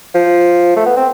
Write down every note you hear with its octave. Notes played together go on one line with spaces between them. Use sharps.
F3
A3
B3
C4